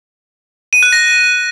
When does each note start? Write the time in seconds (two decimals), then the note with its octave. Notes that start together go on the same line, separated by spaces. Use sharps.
0.73 D#7
0.83 F#6
0.92 A#6